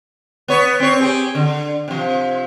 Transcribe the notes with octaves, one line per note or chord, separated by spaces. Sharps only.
B3 C#5
C4 C#5
G4 G#4
D3
C3 F3